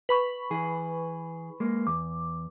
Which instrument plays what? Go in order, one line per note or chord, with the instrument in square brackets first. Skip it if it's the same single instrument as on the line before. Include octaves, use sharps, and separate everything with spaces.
[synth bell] B4 B5 C#6
[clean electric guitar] E3 G#4
G#3 A#3
[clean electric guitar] E2 [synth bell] D6